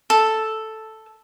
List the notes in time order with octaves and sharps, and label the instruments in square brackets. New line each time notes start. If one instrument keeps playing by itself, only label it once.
[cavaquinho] A4